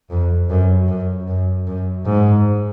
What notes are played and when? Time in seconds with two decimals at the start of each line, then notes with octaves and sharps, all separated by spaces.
0.10 F2
0.50 F#2
0.88 F#2
1.28 F#2
1.67 F#2
2.06 G#2